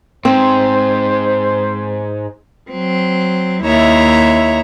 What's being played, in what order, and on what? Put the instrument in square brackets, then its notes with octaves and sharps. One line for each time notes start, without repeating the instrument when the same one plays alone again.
[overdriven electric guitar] G#2 [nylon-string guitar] C4 [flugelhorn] C5
[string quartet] F#3 C4
D#2 E4 C#5 E5 A#5